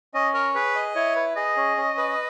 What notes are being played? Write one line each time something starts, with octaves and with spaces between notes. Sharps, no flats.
C#4 D#5
A#4 C#5
G#4 B4
D#5
E4 C#5
B4
G#4 D#5
C#4
C#4
B4